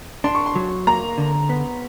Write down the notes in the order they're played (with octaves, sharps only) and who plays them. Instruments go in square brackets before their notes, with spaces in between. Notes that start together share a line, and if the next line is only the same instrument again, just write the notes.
[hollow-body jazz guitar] D4 [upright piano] C6
[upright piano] C#6
C6
[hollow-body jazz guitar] F#3
[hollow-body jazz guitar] A#3 [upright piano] A#5
[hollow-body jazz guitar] D3
B3